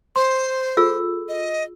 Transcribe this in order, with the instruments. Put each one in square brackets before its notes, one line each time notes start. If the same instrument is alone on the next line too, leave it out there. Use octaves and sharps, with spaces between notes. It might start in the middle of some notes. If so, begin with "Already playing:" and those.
[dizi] C5 [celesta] C6
[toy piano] F4 G#4 E6 [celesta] A4
[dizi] D#5